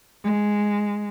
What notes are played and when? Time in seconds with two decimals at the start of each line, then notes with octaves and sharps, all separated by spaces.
0.24 G#3